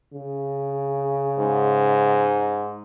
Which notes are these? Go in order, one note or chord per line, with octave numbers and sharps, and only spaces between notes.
C#3
G#2